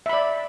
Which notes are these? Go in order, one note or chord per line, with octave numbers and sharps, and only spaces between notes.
D5 E5 B5